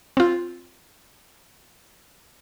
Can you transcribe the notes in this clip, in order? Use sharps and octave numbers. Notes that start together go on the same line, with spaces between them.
C4 F4